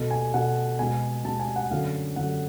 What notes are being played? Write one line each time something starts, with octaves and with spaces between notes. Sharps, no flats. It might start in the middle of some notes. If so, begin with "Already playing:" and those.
Already playing: B2 A3
G#5
B2 A3 F#5
B2 G#3 B3 G#5
B2 G#3 B3 A5
G#5
F#5
F#2 D3 F#3 A3 F5
F#2 D3 F#3 A3 F#5